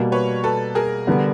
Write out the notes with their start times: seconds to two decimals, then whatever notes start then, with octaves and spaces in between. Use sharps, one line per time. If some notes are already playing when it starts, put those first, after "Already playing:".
Already playing: B2 G3 A#3
0.12 B4 C#5
0.44 A4 B4
0.75 G#4 A#4
1.07 D3 G3 B3